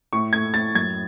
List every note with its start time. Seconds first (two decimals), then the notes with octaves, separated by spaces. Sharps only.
0.13 A2 C#6
0.33 A3 G#6
0.54 A2 A6
0.75 F#2 G#6